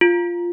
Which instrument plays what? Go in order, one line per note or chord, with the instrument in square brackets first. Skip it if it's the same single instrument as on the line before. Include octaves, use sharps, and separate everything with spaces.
[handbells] F4